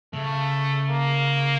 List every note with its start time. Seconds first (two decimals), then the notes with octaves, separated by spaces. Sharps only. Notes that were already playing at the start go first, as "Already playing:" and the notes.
0.13 C#3 A3
0.90 A#3